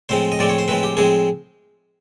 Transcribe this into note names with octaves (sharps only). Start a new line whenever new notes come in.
A2 F3 G#3 C4 C5
D#5
A2 F3 G#3 C4 D5
C#5
C5
A2 F3 G#3 C4 B4
G4
A2 F3 G#3 C4 G#4